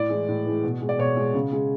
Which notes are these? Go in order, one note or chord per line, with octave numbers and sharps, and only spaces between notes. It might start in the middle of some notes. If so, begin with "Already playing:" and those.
Already playing: A2 D5
E3 G#3
A2
E3 G#3
B2
G#3
D5
B2 C#5
G#3
C#3
G#3